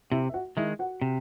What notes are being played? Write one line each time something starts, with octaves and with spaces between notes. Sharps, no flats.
C3 E4 E5
E5
F#4 F#5
D#3 G#3 E4 E5
F#4 F#5
C3